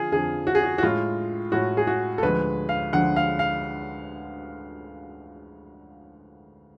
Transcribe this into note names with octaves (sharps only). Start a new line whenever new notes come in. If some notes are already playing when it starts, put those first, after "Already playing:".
Already playing: D3 F3 F4 G#4
F2 D3 F3 G#4
F#4
G#4
F#4
F#4
A2 G#3 F4
A2 G#3 F#4
G#4
F#4
A4
D2 D3 F3 G#3 B4
F5
D2 D3 F3 G#3 F#5
F5
F5